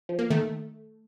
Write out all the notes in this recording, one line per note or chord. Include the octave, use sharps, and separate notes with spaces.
F3
A#3
D#3 A3